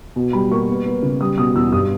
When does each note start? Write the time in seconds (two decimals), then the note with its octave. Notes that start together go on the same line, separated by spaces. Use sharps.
0.16 B2
0.33 G3 B5
0.51 A#3 C#6
0.69 B3
0.86 B3
1.03 C#3
1.21 G3 D#6
1.38 B2 D#6
1.56 E2 E6
1.72 G2 D#6